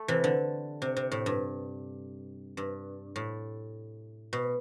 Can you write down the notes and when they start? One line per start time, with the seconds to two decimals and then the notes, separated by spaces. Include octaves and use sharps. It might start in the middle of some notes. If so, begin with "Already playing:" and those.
Already playing: A3
0.08 C3 E3
0.24 D3
0.82 C3
0.97 C3
1.12 A2
1.26 G2
2.57 G2
3.16 A2
4.33 B2